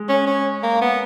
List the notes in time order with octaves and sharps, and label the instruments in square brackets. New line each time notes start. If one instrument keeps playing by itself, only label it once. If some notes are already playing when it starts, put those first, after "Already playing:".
Already playing: [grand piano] G#3
[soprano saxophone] C#4
C#4
A#3
B3